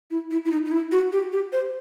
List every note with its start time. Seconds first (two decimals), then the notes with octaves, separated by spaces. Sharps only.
0.11 E4
0.31 E4
0.45 E4
0.51 D#4
0.65 D#4
0.72 E4
0.92 F#4
1.12 G4
1.33 G4
1.53 C5